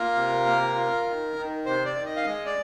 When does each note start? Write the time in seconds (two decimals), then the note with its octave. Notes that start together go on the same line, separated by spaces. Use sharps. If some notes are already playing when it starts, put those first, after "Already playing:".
Already playing: A#3 F4 A#4
0.15 C3
0.46 A#3
0.75 F4
1.05 D#3
1.36 D#3
1.65 C3 C5
1.85 D5
1.95 D#3
2.05 D#5
2.16 F5
2.26 G#3 D#5
2.46 D5